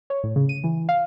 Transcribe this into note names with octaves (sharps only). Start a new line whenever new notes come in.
C#5
A2
C#3
D#7
E3
F5